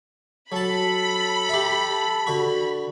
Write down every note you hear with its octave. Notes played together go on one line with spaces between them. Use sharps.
F#3 A4 A5 B5
G4 E5
D3 F#4